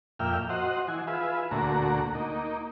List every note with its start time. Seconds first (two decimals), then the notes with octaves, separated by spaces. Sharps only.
0.19 F2 A#2 E5 G5 F6
0.49 F#4 C5 D#5 F#5
0.88 E3 G#5
1.07 F4 G#4 B4 E5
1.51 D2 A#2 A3 F#4 A#5
2.15 A#3 D#4